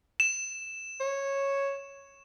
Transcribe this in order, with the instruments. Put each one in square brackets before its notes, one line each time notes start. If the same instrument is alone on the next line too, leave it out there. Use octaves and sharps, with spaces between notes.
[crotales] E7
[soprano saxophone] C#5